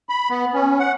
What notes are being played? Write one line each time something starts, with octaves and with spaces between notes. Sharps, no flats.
B5
B3
C#4
F#5